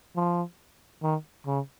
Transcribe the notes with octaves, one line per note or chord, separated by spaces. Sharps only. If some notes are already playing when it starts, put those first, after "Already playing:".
F3
D#3
C#3